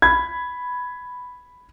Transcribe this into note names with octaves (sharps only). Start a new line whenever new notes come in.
B5 G#6